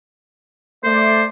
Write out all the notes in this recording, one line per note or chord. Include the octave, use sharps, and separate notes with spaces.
A3 C5 D5